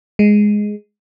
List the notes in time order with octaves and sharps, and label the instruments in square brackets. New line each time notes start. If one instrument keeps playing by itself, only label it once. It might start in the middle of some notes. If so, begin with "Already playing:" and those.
[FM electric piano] G#3